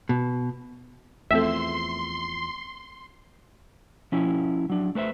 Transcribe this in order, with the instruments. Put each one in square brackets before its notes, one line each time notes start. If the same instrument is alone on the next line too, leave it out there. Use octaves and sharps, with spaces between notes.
[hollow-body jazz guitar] B2
[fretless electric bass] E2 F3 [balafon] A3 C4 A4 [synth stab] E5 [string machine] C6
[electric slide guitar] F3 C#4 E4
F#3 D4
A3 B4 C5 E5